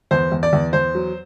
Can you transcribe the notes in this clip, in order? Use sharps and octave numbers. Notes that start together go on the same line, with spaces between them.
E2 C5
E2
D5
E2
E2 C5
F#3